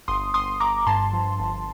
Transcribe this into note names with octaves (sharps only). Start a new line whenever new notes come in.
G1 C6 D#6
G1 C6 D#6
G1 A#5 D6
G2 A5 C6
F3
G1